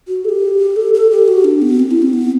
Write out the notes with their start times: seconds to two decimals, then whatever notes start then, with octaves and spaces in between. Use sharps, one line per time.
0.08 F#4
0.25 A4
0.29 G4
0.76 A4
0.94 A4
1.11 G4
1.28 F#4
1.44 D4
1.62 B3
1.79 C4
1.91 E4
2.02 C4
2.13 B3